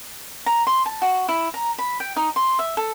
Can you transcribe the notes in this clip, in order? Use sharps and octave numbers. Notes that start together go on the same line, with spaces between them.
A#5
C6
A5
F#4
E4
A#5
B5
G5
D#4
C6
E5
A4